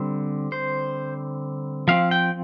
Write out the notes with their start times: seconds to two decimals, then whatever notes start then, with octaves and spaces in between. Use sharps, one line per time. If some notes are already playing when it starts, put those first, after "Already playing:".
Already playing: D3 G3 C4
0.52 C5
1.88 F3 C4 F5
2.11 G5